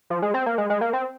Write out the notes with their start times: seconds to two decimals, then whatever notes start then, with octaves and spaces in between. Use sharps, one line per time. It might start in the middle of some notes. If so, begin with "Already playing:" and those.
0.10 F3
0.22 G#3
0.34 C4
0.46 A#3
0.58 G#3
0.70 G#3
0.81 A#3
0.93 C4